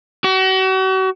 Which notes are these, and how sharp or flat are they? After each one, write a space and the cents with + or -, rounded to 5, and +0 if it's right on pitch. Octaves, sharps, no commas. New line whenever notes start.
F#4 +40